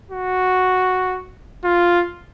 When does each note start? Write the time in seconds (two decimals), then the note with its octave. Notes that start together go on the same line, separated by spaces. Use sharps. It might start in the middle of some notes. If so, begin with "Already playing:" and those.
0.11 F#4
1.65 F4